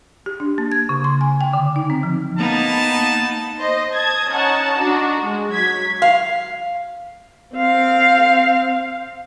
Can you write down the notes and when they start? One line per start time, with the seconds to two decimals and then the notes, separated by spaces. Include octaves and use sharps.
0.26 G4
0.40 D4
0.58 A#3
0.72 G#6
0.89 C#3
1.04 C6
1.21 G#5
1.41 G5
1.53 D3
1.76 D#4
1.90 C4
2.03 F3
2.38 A#3 B3 D#4 A5
3.58 C5 D#5
3.93 A5 D#6 G#6
4.30 C#4 D#4 F#5 A5
4.78 D4 D#4 F#4
5.21 G#3
5.51 F#3 G#6 B6
6.02 F5
7.56 C4 F5